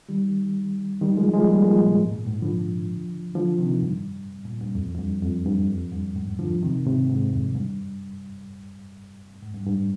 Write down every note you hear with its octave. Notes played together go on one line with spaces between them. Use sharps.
D#3 G3
D#3 G3
F3 G#3
F3 G#3
G3 A#3
F3 G#3
A#2
G#2
A#2
G#2
D3 F3
D3 F3
C3 D#3
G2
A#2
G2
F2
F2
G2
F2
G2
F2
G2
G#2
D3 F3
C3 D#3
G#2 C3
G#2
F2
G2
G#2
G2
G2